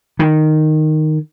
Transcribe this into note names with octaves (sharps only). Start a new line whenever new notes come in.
D#3